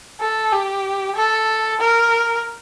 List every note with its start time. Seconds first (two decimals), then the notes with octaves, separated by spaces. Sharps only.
0.21 A4
0.52 G4
1.16 A4
1.80 A#4